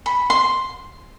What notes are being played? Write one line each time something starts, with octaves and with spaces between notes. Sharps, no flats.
B5
C6